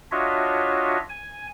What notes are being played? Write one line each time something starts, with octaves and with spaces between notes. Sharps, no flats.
D4 F4 F#4 C#5 D#5 E5
G#5